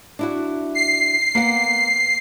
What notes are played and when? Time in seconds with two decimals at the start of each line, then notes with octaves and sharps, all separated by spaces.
0.19 D4 E4 F#4
0.75 C7
1.35 A#3 B3 F#5